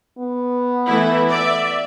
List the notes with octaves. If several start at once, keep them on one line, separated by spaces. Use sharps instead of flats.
B3
E3 A3 E4
D5 E5